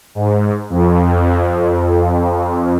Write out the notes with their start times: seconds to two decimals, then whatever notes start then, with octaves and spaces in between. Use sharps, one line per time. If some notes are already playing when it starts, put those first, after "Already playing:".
0.15 G#2
0.70 F2